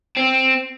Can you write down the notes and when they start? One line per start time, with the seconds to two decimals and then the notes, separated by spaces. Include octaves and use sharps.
0.17 C4